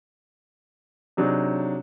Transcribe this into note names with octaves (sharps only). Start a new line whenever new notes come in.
C3 F#3 D4 D#4 G#4